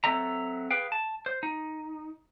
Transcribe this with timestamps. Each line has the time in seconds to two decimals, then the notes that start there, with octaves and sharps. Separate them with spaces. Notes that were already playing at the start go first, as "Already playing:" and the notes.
0.04 F#3 C4 A4 D#5 E5 A#5
0.71 G#4 B4 F5 G5
0.92 A5
1.26 C5
1.43 D#4